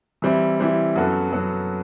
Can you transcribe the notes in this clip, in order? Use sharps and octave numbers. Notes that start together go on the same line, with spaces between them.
E3 G3 C4 E4
E3 G3 C4 E4
F#2 F#3 B3 F#4 A4
F#2 F#3 B3 F#4 A4